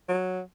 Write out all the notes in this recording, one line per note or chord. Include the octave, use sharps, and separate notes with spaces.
F#3